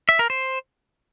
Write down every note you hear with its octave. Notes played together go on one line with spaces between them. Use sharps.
E5
A#4
C5